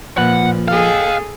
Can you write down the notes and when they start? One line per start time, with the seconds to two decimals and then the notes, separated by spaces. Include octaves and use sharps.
0.17 A#2 F3 B4 F#5
0.68 G#4 A4 D#5 F5